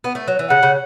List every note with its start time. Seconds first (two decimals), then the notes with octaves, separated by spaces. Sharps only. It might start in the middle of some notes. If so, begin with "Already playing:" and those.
0.04 B3
0.15 A3
0.28 F#3
0.39 E3
0.50 C#3 F#5
0.63 C#3